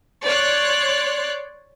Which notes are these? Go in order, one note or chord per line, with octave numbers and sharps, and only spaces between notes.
C#5 D5 C6 F#6